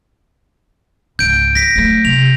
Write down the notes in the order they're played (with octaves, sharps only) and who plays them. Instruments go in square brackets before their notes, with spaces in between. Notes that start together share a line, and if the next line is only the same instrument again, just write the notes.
[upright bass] C#2 G#2 [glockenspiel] G6 D7
[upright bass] D#3 [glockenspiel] A#6 B6 D7
[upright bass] F#3 A3
[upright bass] C3 [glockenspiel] F7